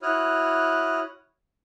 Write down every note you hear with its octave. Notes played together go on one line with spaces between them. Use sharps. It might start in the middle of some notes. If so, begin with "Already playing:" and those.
E4 F#4 C#5 D#6 F6 F#6